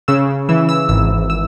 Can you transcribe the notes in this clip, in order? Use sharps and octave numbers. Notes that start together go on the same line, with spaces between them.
C#3 E6
E3 E6
E6
G#1 E6
E6